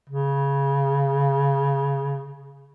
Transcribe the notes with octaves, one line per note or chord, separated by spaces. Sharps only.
C#3